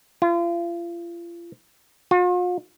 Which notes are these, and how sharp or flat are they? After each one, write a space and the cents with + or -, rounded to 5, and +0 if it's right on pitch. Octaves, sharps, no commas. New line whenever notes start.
F4 -35
F4 +45